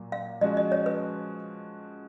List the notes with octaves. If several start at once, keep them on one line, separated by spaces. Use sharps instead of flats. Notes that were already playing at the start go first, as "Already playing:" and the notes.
Already playing: A#2 F#3 A#3
F5
F3 G#3 C#4 F#4 D#5
D#5
C#5
B4